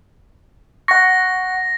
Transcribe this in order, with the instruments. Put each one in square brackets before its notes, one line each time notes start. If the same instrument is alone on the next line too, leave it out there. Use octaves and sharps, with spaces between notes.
[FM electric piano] F#5 C#6 [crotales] A#6